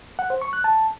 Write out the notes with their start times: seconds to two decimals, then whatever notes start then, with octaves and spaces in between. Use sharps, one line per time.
0.19 F#5
0.30 C5
0.42 C#6
0.53 F#6
0.64 A5